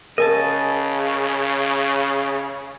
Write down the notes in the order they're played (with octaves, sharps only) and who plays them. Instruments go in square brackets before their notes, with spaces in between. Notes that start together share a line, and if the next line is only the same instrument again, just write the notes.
[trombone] C#3 [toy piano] A#4 [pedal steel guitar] D#5 G#5 A5